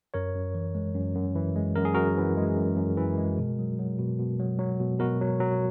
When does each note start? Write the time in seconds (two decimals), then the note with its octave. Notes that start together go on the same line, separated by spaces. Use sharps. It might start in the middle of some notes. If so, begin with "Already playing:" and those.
0.14 F#2 A#4 C#5
0.35 F#2
0.54 E3
0.75 G#3
0.95 F#2
1.15 F#2
1.35 E3
1.56 G#3
1.76 F#2 A#4
1.85 G#4
1.94 F#2 F#4 A#4
2.17 E3
2.37 G#3
2.57 F#2
2.77 F#2
2.97 E3
3.18 G#3
3.39 B2
3.59 F#3
3.79 F#3
3.99 B2
4.19 B2
4.40 F#3
4.59 F#3
4.80 B2
4.99 B2 F#4 A#4
5.21 F#3
5.40 F#3